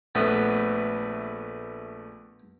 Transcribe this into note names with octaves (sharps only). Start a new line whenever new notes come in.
A#1 A3 B3 B4